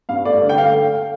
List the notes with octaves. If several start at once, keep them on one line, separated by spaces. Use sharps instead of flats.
G2 F5
A3 D5
D3
G5
A3 F5